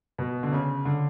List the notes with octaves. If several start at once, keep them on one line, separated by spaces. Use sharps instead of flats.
B2
D3
C#3
D3